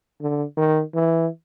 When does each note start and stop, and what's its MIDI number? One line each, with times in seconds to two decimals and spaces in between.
0.21 0.43 50
0.57 0.81 51
0.94 1.28 52